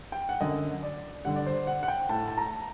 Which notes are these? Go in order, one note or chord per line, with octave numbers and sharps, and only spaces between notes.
G5
F#5
F#2 D3 D#5
D5
G2 D3 F#5
D5
C5
F#5
F#5
G5
A2 A5
A5
A#5